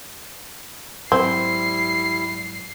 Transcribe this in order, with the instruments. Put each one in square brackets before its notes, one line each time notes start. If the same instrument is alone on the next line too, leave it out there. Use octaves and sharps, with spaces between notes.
[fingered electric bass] G#2 F#3 [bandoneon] G3 E4 [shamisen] C4 [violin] C7